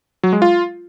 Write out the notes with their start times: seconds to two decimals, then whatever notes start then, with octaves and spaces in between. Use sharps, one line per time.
0.23 F#3
0.33 G#3
0.42 F4